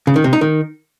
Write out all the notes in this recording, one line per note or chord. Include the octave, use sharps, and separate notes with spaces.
C#3
D#3
C3
D#4
D#3